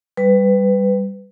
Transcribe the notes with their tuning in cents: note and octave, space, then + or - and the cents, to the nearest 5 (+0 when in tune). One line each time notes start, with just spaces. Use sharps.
G3 +0 B4 +15